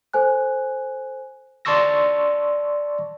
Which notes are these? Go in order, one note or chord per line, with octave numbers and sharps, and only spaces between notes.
A4 C5 G#5 F#6
D5 A5 C6 C#6 E6 A#6